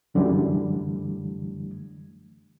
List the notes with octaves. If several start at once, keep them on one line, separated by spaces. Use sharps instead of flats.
C2 F#2 D3 E3 G3 A3